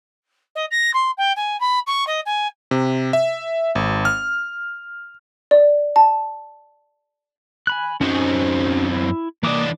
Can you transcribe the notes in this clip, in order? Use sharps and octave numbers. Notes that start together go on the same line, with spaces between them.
D#5
A#6
C6
G5
G#5
B5
C#6
D#5
G#5
C3
E5
G#1
F6
D5
A5
G#5 B5 F#6
F#2 C4 C#4 D#4 F#4
E4
E3 A#3 D4 D6 D#6